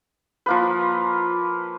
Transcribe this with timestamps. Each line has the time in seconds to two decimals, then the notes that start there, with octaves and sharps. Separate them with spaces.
0.46 F3 A#3 B4